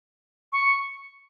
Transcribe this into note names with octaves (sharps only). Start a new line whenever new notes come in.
C#6